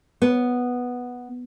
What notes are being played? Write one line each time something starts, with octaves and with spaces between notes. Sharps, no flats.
B3